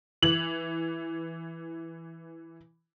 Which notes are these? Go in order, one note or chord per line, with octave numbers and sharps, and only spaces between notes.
E3 F#7